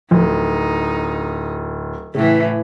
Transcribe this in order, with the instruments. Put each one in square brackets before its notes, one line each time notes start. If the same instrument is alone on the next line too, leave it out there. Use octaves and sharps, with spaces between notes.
[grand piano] D1 [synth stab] F3 [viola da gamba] D#4
[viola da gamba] A2 E3 [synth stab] C#3